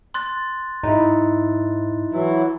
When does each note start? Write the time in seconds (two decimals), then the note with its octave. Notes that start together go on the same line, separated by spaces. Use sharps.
0.14 C6 F#6 A6
0.83 G#2 D#4 E4
2.12 E3 F#3 E4